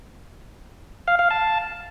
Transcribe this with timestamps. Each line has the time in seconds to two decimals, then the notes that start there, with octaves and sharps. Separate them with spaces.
1.08 F5
1.19 F5
1.31 A5